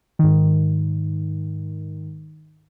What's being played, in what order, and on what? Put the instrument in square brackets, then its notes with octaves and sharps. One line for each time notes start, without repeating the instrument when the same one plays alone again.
[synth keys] G#2 D#3